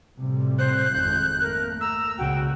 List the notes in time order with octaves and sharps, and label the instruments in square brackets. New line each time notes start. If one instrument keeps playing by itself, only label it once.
[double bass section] A2 C3 G3
[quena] C5 [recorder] F#6
[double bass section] G#1 F2 [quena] G6
[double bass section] A3 A#3 [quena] A#4
[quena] A#5 [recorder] E6
[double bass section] C#2 A#2 C#3 [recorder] F#4 [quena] G5